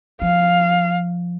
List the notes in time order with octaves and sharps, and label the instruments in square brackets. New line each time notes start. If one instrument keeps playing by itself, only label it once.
[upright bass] F3 [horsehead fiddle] F5